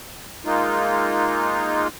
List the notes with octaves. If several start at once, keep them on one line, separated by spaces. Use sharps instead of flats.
G#3 A#3 D#4 F4